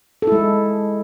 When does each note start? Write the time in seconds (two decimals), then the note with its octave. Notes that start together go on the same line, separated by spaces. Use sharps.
0.22 A4
0.27 E4
0.32 G#3